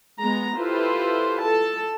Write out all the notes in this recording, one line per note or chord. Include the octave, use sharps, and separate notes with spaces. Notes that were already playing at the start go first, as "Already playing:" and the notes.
G#3 B3 A#5
E4 F4 G4 A4 B4 C5
A4 A5